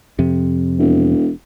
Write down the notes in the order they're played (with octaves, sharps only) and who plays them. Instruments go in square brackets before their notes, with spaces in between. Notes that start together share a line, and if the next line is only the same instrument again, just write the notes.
[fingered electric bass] F2 C3
[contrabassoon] E1